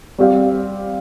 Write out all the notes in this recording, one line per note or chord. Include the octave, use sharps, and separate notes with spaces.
G3 C4 G4 D5 F5